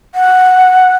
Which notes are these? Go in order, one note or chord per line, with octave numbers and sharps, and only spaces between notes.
F#5